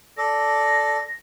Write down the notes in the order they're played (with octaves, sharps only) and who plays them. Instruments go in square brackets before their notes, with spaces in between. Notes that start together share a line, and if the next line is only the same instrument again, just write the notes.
[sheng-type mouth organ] A4 D5 [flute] A#6